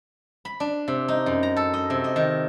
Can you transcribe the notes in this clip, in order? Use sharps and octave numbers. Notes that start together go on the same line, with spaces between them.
B5
D4
C3
D#4
F#2
A#5
A4
D#5
C3
D#5
D#3